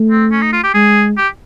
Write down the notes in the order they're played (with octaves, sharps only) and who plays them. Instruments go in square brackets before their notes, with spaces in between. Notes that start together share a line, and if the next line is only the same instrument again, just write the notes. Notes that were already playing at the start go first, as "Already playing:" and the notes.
Already playing: [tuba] A3
[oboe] C4
C#4
D#4
F4
G4
[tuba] G#3 [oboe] G#4
[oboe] G4